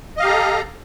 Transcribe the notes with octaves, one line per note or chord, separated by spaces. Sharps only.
G4 A4 D#5 F5 A#5